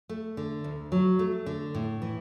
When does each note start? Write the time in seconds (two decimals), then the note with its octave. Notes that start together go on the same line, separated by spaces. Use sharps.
0.09 A3
0.37 D3
0.64 D2
0.92 F#3
1.19 A3
1.46 D3
1.75 A2
2.02 E3